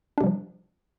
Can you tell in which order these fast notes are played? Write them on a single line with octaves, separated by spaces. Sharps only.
D4 C3 G3 F3